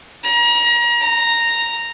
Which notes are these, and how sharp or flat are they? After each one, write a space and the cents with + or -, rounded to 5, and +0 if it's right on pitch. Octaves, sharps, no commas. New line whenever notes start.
A#5 +35
A#5 -5